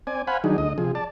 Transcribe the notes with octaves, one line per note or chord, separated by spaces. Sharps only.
C4 D5 G#5
C5 F5 F#5 G#5 B5
D#3 F#3 D4 D#4 G#4
D2 D#5
C3 F3 G#4
D5 A5